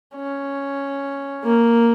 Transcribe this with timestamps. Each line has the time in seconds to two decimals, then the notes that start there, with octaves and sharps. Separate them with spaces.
0.15 C#4
1.44 A#3